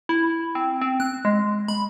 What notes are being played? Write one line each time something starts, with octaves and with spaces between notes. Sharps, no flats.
E4
C4
C4
F#6
G#3
B5